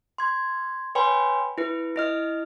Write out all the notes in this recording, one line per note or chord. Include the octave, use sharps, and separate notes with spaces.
C6 G#6
B4 C#5 G5 G#5 B5 C6
E4 B4
E4 D#5 F6